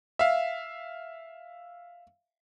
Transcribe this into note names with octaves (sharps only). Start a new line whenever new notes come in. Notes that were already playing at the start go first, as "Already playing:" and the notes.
E5 F5